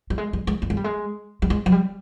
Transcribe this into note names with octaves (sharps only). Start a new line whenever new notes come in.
G3
G#3
G3
G#3
A3
G#3
G3
G#3
G3
G#3
F#3
G3